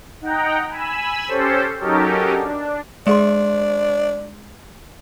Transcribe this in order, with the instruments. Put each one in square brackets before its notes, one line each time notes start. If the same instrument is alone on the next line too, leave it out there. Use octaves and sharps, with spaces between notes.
[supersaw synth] D#4 F#5 G5 A#5
G#5 B5 E6
C#4 G4 A4 C5
F#3 C#4 D#4 G4 A4 A#4
D4
[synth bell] G#3 G#4 C6 [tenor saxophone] D4